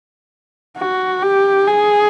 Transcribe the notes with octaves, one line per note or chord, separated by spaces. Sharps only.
F#4
G4
G#4